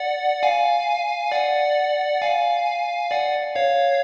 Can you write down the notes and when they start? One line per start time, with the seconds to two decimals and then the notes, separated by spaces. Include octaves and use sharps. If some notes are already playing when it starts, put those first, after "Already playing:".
Already playing: D5 F#5
0.43 F5 G#5
1.32 D5 F#5
2.22 F5 G#5
3.11 D5 F#5
3.55 C#5 F5